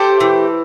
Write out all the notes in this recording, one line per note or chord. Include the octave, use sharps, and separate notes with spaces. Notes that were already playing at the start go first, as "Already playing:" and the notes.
Already playing: A3 G4 C5
E3